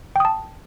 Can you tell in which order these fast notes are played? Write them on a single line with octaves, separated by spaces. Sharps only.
G5 D#6 A5